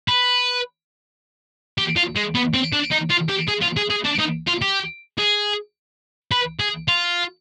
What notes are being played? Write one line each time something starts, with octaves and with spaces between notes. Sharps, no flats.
B4
G4
F4
G#3
B3
C4
D4
D#4
F4
G4
G#4
F4
G#4
G#4
D4
D#4
F4
G4
G#4
B4
G#4
F4